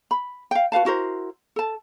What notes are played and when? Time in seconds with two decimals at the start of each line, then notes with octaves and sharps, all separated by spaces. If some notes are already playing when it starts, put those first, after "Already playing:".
0.11 B5
0.51 F5 G5
0.72 F#4 B4 F5 A5
0.85 E4 F#4 A#4 C5
1.56 A4 A5